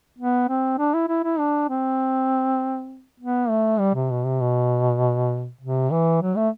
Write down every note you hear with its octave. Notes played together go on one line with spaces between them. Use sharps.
B3
C4
D4
E4
E4
E4
D4
C4
B3
A3
G3
C3
B2
C3
B2
C3
E3
F#3
A3